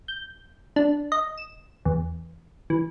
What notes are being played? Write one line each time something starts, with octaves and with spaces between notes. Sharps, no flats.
G6
D4
D#5
E7
E2
E3